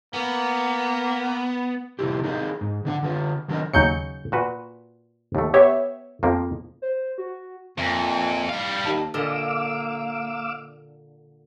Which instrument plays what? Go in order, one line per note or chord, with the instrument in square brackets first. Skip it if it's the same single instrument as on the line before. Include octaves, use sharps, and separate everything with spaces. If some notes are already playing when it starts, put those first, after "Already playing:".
[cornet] A#3 [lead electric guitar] B3
[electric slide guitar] C3 F3 E4 G4
D#4 G#4 A#4 C#5 D#5 F5
G#2
D3 D4 F5 F#5
D3 F4
D#3 F#3 D4 A#4 D#5
[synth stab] D#2 G6 C#7 [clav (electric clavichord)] C#3 F#3 D#4
[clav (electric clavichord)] A#2 F#4 B4
D#2 A3
[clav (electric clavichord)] B3 [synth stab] G4 C#5 E5
[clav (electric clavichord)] F2 F3 A#3
[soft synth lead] C5
F#4
[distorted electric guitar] F2 [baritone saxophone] A#2 [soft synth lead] E5
[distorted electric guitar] G3 F5 [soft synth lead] C7
[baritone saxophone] D#2 [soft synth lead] A5
[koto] A#2 D3 D#5 [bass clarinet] A#3 [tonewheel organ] F5 D6 E6